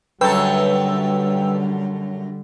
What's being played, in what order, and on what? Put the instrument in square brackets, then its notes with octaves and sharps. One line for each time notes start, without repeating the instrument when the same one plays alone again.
[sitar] F#2 F#3 A4 [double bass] D3 G3 [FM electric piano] B4 G5 E6